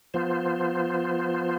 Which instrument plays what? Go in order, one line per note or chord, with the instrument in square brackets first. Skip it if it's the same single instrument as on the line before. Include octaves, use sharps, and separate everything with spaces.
[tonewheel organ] F3 B3 F4 C5